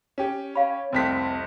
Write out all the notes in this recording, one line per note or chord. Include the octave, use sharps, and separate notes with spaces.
C#4 G4
C#5 F5 B5
F1 C2 C4 B6